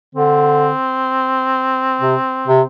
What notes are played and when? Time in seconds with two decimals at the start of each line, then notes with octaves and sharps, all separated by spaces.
0.15 D3 C4
2.01 C3
2.48 C3